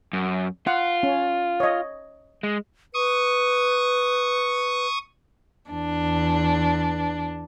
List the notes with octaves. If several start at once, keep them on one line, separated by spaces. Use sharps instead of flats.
F#2
F4 F#5
C#4
C#5 D#5
G#3
B4 C#6 D#6
E2 D4